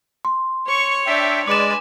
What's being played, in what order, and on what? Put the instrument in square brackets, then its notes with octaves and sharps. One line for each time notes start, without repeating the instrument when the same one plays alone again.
[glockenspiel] C6
[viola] C#5 [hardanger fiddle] C#6
[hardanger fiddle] D4 [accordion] E5 G5
[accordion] G#3 D5 [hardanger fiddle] B4 G#5 [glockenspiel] D6 E7